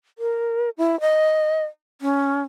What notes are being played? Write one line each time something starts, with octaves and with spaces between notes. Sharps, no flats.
A#4
E4
D#5
C#4